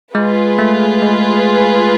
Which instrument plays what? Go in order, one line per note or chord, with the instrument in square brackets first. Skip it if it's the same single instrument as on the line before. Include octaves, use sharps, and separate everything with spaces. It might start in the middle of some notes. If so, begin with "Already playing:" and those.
[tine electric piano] G#3 [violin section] F4 G#4 B4
[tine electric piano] A3
G#3